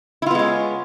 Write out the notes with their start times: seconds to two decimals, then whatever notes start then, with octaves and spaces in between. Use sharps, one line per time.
0.22 E4
0.26 F4
0.31 B3
0.35 G#3
0.39 C#4